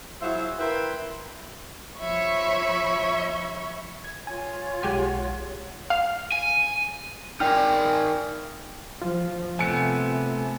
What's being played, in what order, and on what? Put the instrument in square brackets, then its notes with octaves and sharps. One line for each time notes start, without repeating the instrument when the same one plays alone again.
[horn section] F#3 E4 F4 G#4 C5 E5
E4 A#4 B4 E5 G5 C6
[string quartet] F3 C#5 E5 B5 C#6
[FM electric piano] G#6
[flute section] F4 C#5 [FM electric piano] G#5
[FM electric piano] B1 G#3 F#5 [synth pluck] G4 G#5
[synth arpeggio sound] F5
[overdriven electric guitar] G#5
[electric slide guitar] D#4 A#4 G#5 [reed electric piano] D5 G5 F6
[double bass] F3 [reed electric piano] F4
[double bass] C3 [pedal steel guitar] A3 B3 [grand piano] G#5 C#7